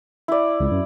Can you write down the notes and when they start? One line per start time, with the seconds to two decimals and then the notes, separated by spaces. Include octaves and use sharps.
0.28 E4 D5
0.60 C#2
0.71 F#2